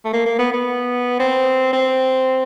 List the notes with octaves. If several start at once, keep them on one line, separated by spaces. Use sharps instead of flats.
A3
A#3
A#3
B3
B3
C4
C4